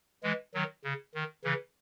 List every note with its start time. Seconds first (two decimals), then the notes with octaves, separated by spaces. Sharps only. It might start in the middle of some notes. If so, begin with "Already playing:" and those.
0.23 E3 G#3
0.54 D#3 F#3
0.84 C#3
1.14 D#3
1.44 C#3 E3